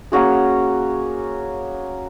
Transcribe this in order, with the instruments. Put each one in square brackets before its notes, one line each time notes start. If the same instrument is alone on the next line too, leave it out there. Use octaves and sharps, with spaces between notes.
[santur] A#3 C#4 F#4 G#4